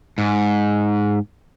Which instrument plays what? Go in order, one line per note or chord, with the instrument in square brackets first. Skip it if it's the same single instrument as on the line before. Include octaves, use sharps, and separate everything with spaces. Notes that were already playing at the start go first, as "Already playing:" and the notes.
[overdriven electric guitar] G#2